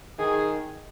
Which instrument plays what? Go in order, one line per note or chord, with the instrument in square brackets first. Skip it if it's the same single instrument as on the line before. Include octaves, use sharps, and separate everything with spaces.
[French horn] D#3 [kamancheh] G#4